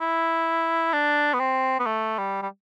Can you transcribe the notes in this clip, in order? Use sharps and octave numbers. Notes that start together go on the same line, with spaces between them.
E4
D4
B3
C4
B3
A3
G3
G3